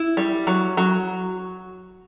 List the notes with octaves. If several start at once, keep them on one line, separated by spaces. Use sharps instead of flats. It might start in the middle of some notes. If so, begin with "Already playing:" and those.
Already playing: E4
G3
F#3
F#3